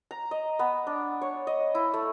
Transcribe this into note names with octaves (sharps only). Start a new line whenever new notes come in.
A#5
D#5
B3
D4
C#5
D#5
E4
A3